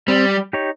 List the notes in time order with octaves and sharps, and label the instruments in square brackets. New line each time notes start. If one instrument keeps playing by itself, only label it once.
[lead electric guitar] G3 [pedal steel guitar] C4
[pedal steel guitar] D#4 G4 C#5